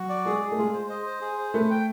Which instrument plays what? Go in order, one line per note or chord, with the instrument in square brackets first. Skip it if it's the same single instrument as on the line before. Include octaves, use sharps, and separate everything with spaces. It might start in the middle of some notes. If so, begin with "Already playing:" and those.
Already playing: [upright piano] F#3 [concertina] F#4
[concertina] D5
[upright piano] G#3 [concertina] G#4
[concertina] G#4
[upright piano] A3
[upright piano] G#3 [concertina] F4
[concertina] C5
D#5
C5
G#4
C5
[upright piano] A3 [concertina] B4
[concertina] G5